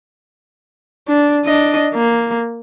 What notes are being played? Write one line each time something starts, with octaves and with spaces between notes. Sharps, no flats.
D4
D4 D#5
A#3